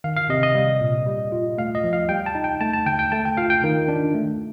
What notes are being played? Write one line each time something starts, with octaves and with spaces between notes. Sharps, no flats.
D#3 F5
F5
C3 D#5
D#5
G3
A#2
G3
F4
A3 F5
D#5
F3
F5
G3 G5
A5
D#4
G5
A3 A5
A5
D3 G5
G5
A3 A5
G5
F4 F5
G5
D#3
D4
A3